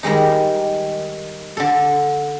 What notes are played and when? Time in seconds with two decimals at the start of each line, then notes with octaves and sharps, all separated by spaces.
0.03 D#3 G3 G#3 D#4
1.57 D3 A4